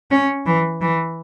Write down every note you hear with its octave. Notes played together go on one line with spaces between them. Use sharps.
C#4
E3
E3